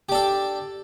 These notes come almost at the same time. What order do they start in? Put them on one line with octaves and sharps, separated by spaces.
G4 D4 A4